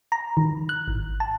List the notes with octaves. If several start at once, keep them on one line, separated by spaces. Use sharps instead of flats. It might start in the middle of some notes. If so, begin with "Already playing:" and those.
A#5
D#3
F#6
G#1
A5